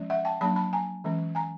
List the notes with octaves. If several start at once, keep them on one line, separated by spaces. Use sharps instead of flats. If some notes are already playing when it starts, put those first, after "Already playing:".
Already playing: F3 G#3 C#4
E5 F#5
G5 A5
F#3 A#3 D4 A5 B5
A5 B5
G#5 A#5
E3 G#3 C#4
G#5 A#5